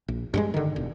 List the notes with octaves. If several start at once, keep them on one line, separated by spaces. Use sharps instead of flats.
A#1
G2 G3 G#3
D3 D#3
E1